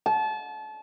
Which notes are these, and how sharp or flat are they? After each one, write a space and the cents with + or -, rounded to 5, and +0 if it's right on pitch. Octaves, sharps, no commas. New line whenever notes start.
A5 -30